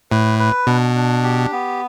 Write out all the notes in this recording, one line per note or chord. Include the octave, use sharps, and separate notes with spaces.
A2 B4
B4
B2 D4
D4
G4
B3